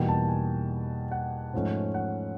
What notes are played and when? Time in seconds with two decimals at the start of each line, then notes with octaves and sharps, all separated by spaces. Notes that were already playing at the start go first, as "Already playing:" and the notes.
Already playing: E2 B2 G3 A#3 D#4 G5
0.09 A5
0.28 G#5
1.12 F#5
1.54 G#2 F3 A3 C#4
1.94 F#5